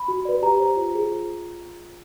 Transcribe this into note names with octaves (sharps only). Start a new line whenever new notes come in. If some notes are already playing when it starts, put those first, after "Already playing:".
Already playing: B5
F#4
B4 D5
G4 A#5
C5
F4
G#4 C5
F4